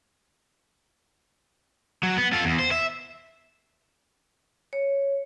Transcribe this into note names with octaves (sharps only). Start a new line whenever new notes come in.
F#3
B3
F4 A4
E2
C5
E5
C#5